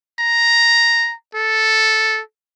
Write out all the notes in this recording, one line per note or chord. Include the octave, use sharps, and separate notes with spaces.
A#5
A4